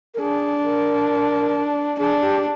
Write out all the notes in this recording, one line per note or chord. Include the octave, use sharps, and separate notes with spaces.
A#4
D4 G#4
A#4
D4 G#4
G4